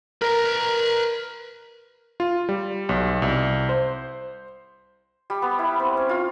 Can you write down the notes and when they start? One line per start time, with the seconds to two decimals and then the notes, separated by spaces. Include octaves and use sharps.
0.22 A#4 B4 A#5
2.20 F4
2.49 G3
2.89 B1
3.22 C2
3.69 C5
5.30 G3
5.42 B3
5.59 E4
5.80 C4
5.97 C#4
6.09 F4